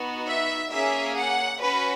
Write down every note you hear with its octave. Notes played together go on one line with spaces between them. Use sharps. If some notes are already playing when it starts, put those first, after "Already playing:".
Already playing: B3 D#4 F#4
E5
A#3 C#4 G#4 E5
F#5
C#4 F#4 B4